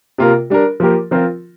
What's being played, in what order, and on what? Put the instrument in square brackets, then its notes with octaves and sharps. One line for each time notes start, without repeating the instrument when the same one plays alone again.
[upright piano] C3 A#3 F4 A#4
G3 D4 A#4
F3 A#3 G4 A#4
F3 C4 F4 A#4